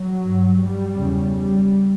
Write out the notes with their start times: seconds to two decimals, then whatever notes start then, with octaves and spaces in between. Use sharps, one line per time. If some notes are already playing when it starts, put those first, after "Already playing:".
Already playing: F#3
0.24 G2
0.60 G3
0.95 E2 C#3
1.31 G3